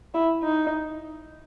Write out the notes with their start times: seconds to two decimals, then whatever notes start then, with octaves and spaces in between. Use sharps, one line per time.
0.14 E4
0.43 D#4